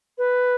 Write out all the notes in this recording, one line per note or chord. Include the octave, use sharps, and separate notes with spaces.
B4